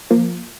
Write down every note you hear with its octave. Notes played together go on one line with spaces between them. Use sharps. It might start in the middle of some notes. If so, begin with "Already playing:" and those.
F3 A#3